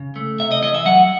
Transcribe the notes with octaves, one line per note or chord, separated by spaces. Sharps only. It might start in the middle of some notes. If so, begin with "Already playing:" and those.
Already playing: C#3
A3
C3 E5
D#5
E3 D#5
E5
F#3 F#5